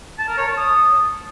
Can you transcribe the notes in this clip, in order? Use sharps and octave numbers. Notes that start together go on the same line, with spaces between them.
A5
A#4
C#5
A5
D#6